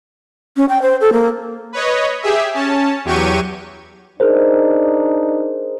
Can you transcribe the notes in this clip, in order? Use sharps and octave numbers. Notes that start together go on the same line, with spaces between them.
C#4
G5
C5
A4
A#3
B4 C#5 D#5
G4 G#4 E5
C#4 A5
E2 F#3 G4 C#6 D#7
D4 D#4 G#4 A#4 C5